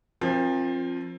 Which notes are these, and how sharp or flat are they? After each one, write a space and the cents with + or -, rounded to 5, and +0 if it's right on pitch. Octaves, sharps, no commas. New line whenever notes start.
F3 +0 C4 +35 A#4 +25